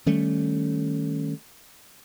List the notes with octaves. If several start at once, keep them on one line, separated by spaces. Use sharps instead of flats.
D#3 G3 A3 C#4